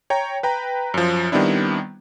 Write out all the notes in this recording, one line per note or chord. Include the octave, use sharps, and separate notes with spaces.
C#5 G5 A#5
B4 G5 A#5
F#2 F3
D#3 G3 B3 C4 D4 E4